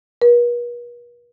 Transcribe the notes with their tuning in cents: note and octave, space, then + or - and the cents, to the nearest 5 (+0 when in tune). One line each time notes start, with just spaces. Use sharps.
B4 -45